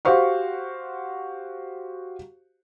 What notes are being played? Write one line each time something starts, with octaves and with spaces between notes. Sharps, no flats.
F#4 G4 C5 F5 C#6